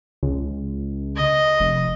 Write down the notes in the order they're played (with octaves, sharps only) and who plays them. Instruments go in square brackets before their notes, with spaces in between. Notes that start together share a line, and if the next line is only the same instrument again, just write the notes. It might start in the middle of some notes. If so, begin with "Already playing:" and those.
[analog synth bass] C#2
[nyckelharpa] D#5
[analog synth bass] F1